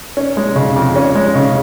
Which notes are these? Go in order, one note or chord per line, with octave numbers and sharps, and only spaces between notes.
C#4
G#3
C#3
F2
C#4
G#3
C#3